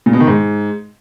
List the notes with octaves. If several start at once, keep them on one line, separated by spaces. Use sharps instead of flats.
A#2
B2
D#3
G#2